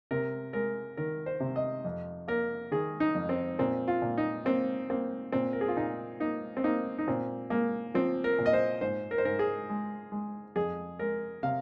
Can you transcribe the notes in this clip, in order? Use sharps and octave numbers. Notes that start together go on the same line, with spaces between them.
C3 A#4
G#3 A#4
D#3 A#4
C5
C3
D#5
F2
A#3 A#4
D#3 G#4
D#4
F2
C4
A#2 C4
F4
A#2
D#4
A#3 C4
A#3 C4
A#2 C4
A#4
G#4
F4
A#2 D#4
A#3 D#4
C4
A#3 D#4
D#4
A#2 C4
G#3 A#3
F3 C4
A#4
A#2
D#5
C5
G#2 C5
A#4
C5
G#2 A#4
G#4
G#3
G#3
F2 G#4
G#3 A#4
C3 F5